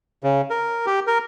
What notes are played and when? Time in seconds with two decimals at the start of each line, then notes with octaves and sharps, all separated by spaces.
0.23 C#3
0.50 A#4
0.86 G4
1.07 A#4